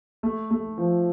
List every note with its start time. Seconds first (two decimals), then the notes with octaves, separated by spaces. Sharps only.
0.23 A3
0.51 A3
0.78 F3